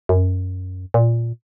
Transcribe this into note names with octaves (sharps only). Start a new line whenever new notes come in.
F#2
A#2